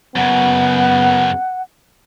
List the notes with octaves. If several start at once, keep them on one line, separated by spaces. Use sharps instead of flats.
F#2 C#3 B3 F#5